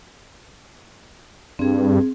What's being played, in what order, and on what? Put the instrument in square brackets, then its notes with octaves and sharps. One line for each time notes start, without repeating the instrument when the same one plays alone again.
[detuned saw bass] G2 [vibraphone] C4 G#4